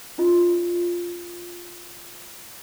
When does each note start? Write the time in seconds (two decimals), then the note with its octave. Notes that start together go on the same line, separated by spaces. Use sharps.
0.18 C#4 D#4 F4 D#5